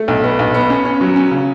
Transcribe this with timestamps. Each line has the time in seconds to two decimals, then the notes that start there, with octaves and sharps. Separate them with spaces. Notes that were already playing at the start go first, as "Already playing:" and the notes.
Already playing: A3
0.08 B1
0.24 B3
0.39 B1
0.54 B3
0.70 C#4
0.85 C#4
1.01 F#3
1.16 C#4
1.31 C#3